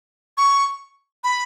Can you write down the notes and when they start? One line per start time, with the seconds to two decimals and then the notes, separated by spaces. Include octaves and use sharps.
0.37 C#6
1.24 B5